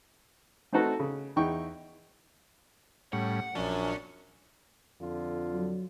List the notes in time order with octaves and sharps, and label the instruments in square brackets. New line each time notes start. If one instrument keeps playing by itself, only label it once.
[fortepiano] A3 C4 D#4 F#4 A4 B4
C#3
E2 D#4 E4 G5 C#6
[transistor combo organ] A2 G3 C#4 [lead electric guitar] F#5
[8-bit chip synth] A#1 D4 [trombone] F#2 [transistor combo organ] F3 [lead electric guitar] C#4
[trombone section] F2 D3 F4
[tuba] F#3